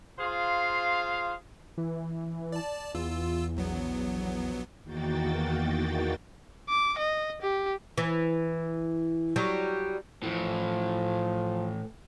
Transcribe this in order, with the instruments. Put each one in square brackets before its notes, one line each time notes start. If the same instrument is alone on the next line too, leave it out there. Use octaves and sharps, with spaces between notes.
[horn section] F4 G#4 C5 F5
[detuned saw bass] E3
[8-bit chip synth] D5 A5
[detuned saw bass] E2 [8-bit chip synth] F4 E6
[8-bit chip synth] A#1 F#3 B3
[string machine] E2 D#3 A#3 F#4 G5 A6
[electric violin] D6
D#5
G4
[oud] E3
F#3 G3
[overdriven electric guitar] A2 E3 [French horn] F3